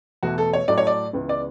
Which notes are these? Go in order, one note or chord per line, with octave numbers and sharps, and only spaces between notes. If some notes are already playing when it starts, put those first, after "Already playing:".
E2 B2 A3 F#4
A4
C#5
A2 F#3 A3 D5
C#5
D5
C#2 C#3 E3 B3
D5